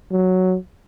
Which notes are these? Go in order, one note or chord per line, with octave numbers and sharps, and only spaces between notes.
F#3